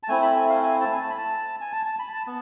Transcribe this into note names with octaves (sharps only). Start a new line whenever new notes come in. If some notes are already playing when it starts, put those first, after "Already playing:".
A5
A3 C4 E4 G#5
B5
G#5
F5
G#5
A5
G#5
A5
B5
A5
G#5
A5
A5
B5
A5
B3